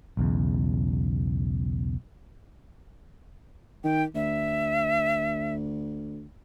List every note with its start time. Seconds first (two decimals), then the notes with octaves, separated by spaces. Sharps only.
0.17 B1 E2 C#3
3.84 D#3 G5
4.15 D2 E5